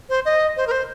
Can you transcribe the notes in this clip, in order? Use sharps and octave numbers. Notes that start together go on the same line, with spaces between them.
C5
D#5
C5
A#4
C5